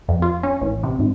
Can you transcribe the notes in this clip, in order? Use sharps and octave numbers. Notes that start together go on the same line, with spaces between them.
F2
F4
C#4
A1
C3
G#1